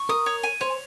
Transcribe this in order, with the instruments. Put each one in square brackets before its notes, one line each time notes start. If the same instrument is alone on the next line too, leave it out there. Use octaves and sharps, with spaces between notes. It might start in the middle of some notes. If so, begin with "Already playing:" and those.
Already playing: [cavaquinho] C#6
[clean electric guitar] A#4 [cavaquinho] D#6
[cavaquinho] C#5
G#5
[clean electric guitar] C5 [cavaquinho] C#5